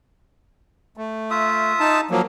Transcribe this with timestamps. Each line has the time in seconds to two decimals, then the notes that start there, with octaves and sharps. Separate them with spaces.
0.97 A3
1.30 F4 E5 D#6
1.80 D#4 A5
2.11 F3 F#3 A#3